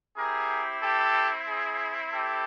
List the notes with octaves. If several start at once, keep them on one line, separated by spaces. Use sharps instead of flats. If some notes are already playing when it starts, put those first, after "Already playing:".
C4 E4 G4 G#4 A#4
G4 A4
G#4
G4 A4